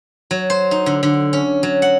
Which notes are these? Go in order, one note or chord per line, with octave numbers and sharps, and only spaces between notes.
F#3
C5
D#4
D3
D3
C#4
F#3
F#5